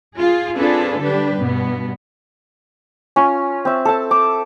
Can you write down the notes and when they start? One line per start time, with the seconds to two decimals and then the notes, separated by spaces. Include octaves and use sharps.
0.19 F4 G#4
0.57 C4 D4 F4 G#4 A4 B4
1.00 D3 G3 D4 G4 B4
1.40 G2 B2 B3
3.16 C#4 F4
3.65 C4 E5
3.85 A4 A5
4.11 D6